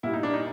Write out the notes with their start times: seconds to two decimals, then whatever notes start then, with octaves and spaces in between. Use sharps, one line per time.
0.03 A#2 G3 E4
0.13 D#4
0.23 D4
0.34 D#4